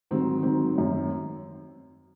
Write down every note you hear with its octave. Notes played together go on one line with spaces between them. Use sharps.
G#2 D#3 F#3 C4
G#2 D#3 F#3 C4
F#2 D#3 F#3